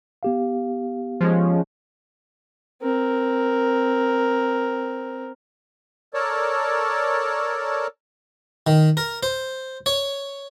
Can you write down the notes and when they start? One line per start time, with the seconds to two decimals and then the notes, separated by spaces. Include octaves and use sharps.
0.23 B3 G4 F5
1.21 F3 G#3 C#4
2.82 C4 A#4
6.14 A4 A#4 C#5 D5 A5
8.67 D#3
8.97 A#4
9.23 C5
9.86 C#5